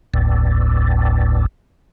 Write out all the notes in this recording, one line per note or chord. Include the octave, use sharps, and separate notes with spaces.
G1 D2 A2